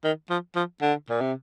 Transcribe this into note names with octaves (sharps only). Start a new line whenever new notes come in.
D#3
F3
F3
D3
A#2
C3